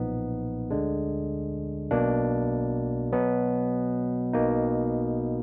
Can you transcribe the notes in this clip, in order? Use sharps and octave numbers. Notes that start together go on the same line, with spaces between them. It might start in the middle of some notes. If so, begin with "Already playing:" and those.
Already playing: B1 A#2 F3 B3 D#4
D2 D3 G#3 D4
B1 B2 A#3 D4
B2 F#3 B3
B1 B2 A#3 D#4